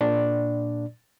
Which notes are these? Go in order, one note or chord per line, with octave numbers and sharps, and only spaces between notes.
A#2 D4 D5